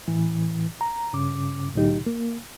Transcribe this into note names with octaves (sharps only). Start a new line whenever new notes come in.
A2 E3
A#5
G2 C#3 C#4 D6
C2 A2 D3 F#3 D#4 G4
A#3